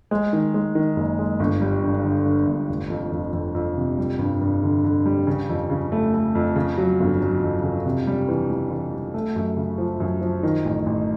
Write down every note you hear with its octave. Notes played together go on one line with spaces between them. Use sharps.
G#3
D#3
G#3
D#3
F#1
G#3
G1
G3
G2
D3
D3
G1
F1
F2
F2
F2
F2
C3
G3
G2
G2
D3
D3
G3
C#3
F2
C#3
A3
A3
F2
C#3
F#3
G1
F#3
F2
C#3
C3
G3
E3
G3
E3
G3
A3
F#2
C#3
F3
F#2
F3
D#3
A1
A1